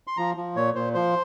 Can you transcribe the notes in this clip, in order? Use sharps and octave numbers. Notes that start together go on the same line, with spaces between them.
C6
F3 A#5
F3
A#2 C#5
A#2 C5
F3 C5